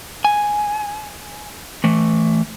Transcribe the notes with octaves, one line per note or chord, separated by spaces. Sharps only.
G#5
E3 A3